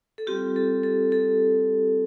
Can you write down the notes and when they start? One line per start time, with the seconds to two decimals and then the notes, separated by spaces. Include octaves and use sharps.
0.18 A4
0.27 G3 C4 F4 G4
0.56 A4
0.84 A4
1.12 A4